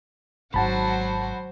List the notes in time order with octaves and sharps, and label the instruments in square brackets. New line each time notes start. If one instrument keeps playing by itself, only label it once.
[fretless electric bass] G#1 G#2 [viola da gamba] F#3 F#4 C5 [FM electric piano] F#5 A5 B5